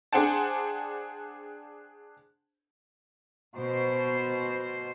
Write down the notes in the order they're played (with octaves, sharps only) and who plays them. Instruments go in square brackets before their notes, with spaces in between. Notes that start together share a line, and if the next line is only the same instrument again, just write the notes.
[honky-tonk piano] D4 G#4 C5 F#5 G5 A5
[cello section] B2 C5